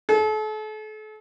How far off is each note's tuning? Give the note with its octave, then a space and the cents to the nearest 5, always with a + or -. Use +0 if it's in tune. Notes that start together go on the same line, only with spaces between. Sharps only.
A4 -40